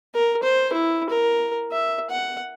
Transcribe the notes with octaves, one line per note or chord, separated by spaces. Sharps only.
A#4
C5
E4
A#4
E5
F#5